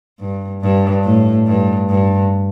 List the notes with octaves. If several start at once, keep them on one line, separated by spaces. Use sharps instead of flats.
G2
G2
A2
G2
G2